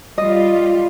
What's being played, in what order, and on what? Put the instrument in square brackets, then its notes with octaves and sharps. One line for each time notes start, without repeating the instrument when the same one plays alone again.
[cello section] G3 F4 [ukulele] D#5